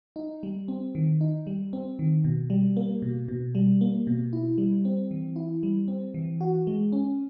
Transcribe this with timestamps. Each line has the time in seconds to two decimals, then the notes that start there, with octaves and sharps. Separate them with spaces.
0.16 D#4
0.43 G3
0.68 C4
0.95 D#3
1.21 D#4
1.47 G3
1.73 C4
1.99 D#3
2.24 B2
2.50 G3
2.77 A#3
3.02 B2
3.28 B2
3.55 G3
3.81 A#3
4.07 B2
4.33 E4
4.58 G3
4.85 C4
5.11 E3
5.36 E4
5.63 G3
5.88 C4
6.14 E3
6.41 F#4
6.67 G#3
6.92 C#4